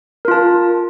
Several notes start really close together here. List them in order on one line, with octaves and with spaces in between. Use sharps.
A#4 F4 A5